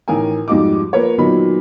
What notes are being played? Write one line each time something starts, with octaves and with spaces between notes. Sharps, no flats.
A1 D#3 A#4 G#5
F2 G#2 G3 D#4 F#4 D6
F3 A#3 A#4 B4 C#5
A#2 D#3 F#3 B3 D#4 B5